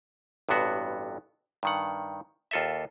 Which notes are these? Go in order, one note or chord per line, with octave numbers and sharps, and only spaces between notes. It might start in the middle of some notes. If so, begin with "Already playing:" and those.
A1 G2 C3 B3 F#4
G2 D#3 F#5
D#2 F4 A4 D#5 E5